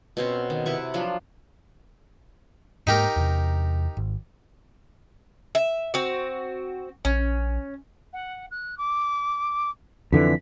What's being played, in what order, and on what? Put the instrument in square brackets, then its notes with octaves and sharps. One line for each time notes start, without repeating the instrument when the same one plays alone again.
[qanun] B2 C4 C#4
D#3
C3 E4 B4 C#6
F3 F#3 D4 F4
[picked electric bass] G#2 A#3 [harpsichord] D#4 G4 A#4
[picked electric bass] E2 C3
G#1
[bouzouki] E5
C4 F#4
[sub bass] A#1 [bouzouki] C#4
[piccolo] F#5
F#6
D6
[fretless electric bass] F2 D3 E3 [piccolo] B6